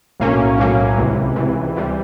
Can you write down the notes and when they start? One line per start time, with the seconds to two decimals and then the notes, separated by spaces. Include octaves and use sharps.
0.20 B1 A2 F#3 A#3 C#4
0.59 B1 A2 F#3 A#3 C#4
0.97 C#2 C3 E3
1.36 C#2 C3 E3
1.76 C3 E3 G3